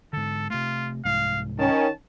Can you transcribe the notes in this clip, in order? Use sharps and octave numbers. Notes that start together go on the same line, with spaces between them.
G#2 D3 A4
C3 A3 F4
C2 G#2 F5
D#3 C#4 A5